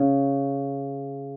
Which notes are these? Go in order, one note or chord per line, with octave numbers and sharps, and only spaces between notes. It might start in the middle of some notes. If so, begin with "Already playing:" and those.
Already playing: C#3